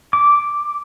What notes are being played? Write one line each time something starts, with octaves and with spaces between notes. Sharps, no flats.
D6